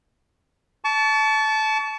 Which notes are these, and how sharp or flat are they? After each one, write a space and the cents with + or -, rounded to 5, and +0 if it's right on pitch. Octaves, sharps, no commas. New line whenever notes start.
A5 -15 C#6 +35